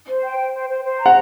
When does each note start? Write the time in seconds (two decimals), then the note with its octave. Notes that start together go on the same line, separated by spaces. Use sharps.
0.09 C5
0.23 G5
0.39 C5
0.54 C5
0.69 C5
0.84 C5
0.99 A#5
1.06 F#5